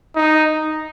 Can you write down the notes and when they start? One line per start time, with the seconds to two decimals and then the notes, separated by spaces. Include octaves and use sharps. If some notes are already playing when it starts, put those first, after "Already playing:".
0.16 D#4